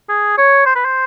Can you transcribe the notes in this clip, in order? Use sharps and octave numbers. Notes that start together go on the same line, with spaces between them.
G#4
C#5
C5
B4
C5